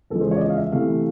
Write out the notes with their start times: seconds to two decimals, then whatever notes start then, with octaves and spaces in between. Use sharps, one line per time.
0.10 E2 C#3 F3 G#3 A4
0.21 C5
0.31 C#5
0.37 D5
0.41 D#5
0.50 F5
0.57 E5
0.72 C3 E3 A3 F5